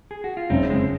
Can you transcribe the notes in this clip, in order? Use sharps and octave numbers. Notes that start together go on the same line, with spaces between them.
G#4
F#4
F4
F#1 C4 D#4
G#3 C4